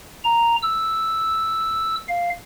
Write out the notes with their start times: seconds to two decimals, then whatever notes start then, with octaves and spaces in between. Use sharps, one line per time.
0.24 A#5
0.63 E6
2.08 F5